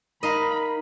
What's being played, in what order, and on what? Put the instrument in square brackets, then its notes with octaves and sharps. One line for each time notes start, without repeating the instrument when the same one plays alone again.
[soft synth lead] D#4 [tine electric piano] A#4 A#5 [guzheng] D#5 F5 [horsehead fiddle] B5